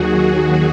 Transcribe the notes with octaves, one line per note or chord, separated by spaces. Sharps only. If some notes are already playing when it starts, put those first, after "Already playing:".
Already playing: D#2 D#3 F#3 F#4 G#4